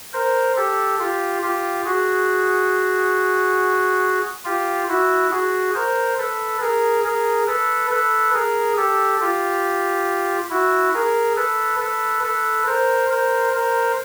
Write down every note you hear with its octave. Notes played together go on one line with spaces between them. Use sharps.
A#4 C5
G4 A4
F4 G4
F4 G4
F#4 G#4
F4 G4
E4 F#4
F#4 G#4
A#4 C5
A4 B4
G#4 A#4
G#4 A#4
A4 B4
A4 B4
G#4 A#4
G4 A4
F4 G4
E4 F#4
G#4 A#4
A4 B4
A4 B4
A4 B4
A#4 C5
A#4 C5
A#4 C5